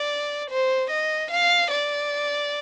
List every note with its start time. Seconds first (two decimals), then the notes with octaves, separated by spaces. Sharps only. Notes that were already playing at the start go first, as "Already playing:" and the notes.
Already playing: D5
0.50 C5
0.90 D#5
1.31 F5
1.71 D5